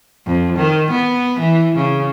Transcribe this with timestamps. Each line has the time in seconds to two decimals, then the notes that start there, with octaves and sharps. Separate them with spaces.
0.26 F2
0.57 D#3
0.91 B3
1.40 E3
1.76 C#3